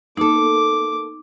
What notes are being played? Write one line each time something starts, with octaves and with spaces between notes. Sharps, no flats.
A#3 D#4 A4 D6